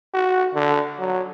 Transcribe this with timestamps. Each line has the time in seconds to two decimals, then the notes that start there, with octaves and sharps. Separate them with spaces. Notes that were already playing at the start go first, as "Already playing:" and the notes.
0.14 F#4
0.55 D3
0.99 F#3